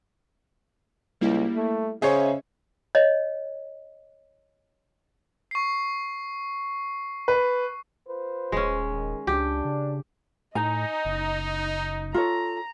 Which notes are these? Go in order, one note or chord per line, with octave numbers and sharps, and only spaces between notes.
C#2 G3 A#3 E4
A3
C#3 C#4 G#4 C5 C#5 D#5 E5
C#5 D#5
C#6 C7
B4
F4 B4 C5
D#1 G#3 C#4
D#3
C#2 D4 G4
C#3
A2 D#4 D#5 G#5 A#5
F#1
F4 A4 C#5 A#5